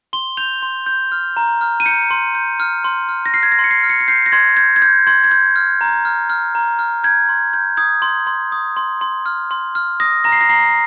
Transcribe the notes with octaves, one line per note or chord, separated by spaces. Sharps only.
C6 G7
G6 F7
C6
G6
F6
A#5
F6
D#7
G6 C#7
C6
G6
F6
C6
F6
A#6
F6 C7
G#6
A#6
C6
C#7
C7
F6
C#7
C#7
G6 C7
A#6
C6 G#6
G6 G#6
G#6
G6
C6 G#6
G#6
G6
F6
A#5
F6
F6
A#5
F6
G6 G#6
C6
G6
D#6 G#6
C6
C6
D#6
C6
C6
F6
C6
F6
D#6 A#6
A#5 A#6
C7
A#6
A#5 C7